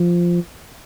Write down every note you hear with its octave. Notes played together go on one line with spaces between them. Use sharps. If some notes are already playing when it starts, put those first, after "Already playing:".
Already playing: F3